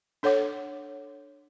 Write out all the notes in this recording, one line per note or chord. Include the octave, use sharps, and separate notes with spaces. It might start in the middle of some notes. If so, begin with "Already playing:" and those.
D4 A4 C#5 F#5 D6